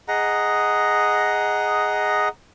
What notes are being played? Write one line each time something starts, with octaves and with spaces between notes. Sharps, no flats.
G#4 D#5 F#5 A#5